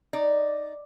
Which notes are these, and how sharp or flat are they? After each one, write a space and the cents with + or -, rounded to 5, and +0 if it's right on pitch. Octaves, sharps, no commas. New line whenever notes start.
D#4 -5 D5 +0